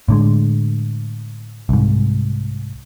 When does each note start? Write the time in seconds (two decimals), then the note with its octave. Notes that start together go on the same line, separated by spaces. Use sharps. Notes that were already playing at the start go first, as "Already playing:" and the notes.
0.08 A2 D3 G#3
1.69 C2 G#2